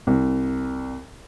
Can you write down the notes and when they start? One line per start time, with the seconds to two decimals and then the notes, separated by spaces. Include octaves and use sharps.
0.07 C2